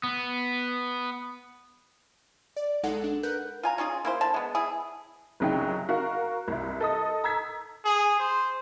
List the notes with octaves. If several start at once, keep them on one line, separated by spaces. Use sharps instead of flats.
B3
D5
B1 G#3 D#4 A4 F#5
D4
A#4 B4 F#5 F#6 G6
F4 G#5 A#5
C#4 D#4 F4 G#4
A#3 E4 C5
D3 A5
G#3 B3
E4 G#4
C2 C#3 F#3 D#4 E4 G5
F#4 A#4 F5
C2 E4
A4 D#5 D#6
A#5 E6 G#6 B6
G#4
C5